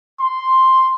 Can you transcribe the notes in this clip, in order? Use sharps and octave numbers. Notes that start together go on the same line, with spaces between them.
C6